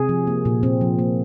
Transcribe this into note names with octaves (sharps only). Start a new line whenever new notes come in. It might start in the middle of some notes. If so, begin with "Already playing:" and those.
Already playing: C3 G#4
F3
A#3
A#2
A#2 C4
F3
A#3